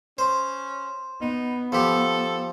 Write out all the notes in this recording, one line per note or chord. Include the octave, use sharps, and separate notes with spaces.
C#4 C5
B3 D#4
F3 G4 A4